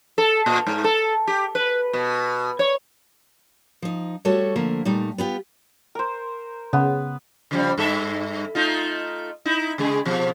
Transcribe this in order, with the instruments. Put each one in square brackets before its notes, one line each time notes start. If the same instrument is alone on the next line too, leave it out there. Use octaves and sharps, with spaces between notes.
[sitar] A4
A#2
G#2
A4
G4
B4
B2
C#5
[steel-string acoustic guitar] F3 D#4
G3 A3 F#4 A4 C#5
D3 F3 A3 A#3
A#2 G3 A3 D#4
B3 F4 G4
[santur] A#4 C5
[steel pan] C#3 [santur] B3
[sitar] C#3 F3 G3
G2 A4 E5
A3 D#4 F4
D#4 E4
C#3 G#3 G#4
B2 F3